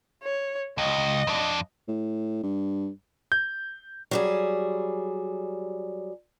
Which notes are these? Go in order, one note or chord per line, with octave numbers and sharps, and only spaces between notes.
C#5
C#2 D#5
F2 D4
A2
G2
G6
F#3 G3 G#4